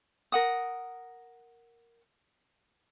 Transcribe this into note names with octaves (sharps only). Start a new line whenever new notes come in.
A#4 F#5 D#6